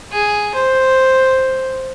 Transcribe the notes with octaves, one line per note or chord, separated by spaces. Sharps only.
G#4
C5